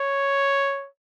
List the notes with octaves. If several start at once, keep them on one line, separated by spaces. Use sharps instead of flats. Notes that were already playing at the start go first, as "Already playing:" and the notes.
Already playing: C#5